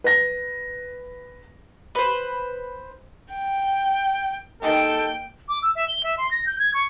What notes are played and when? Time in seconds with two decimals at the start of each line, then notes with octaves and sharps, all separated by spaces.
0.04 B4 A#6
1.95 B4 C5
3.32 G5
4.62 D#3 G#3 A#3 G4 A4 G5
5.49 D6
5.62 E6
5.75 E5
5.88 G7
6.03 E5
6.18 C6
6.31 A#6
6.46 G6
6.59 G#6
6.74 C#6